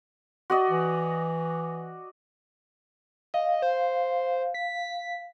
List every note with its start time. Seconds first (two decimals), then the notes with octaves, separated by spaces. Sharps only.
0.50 F#4 D5 D#5
0.70 E3
3.34 D#5 F5
3.62 C5
4.54 B6